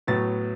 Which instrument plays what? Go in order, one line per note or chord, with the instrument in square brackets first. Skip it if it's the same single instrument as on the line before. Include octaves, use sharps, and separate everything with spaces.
[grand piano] A2 F#3 B3 A6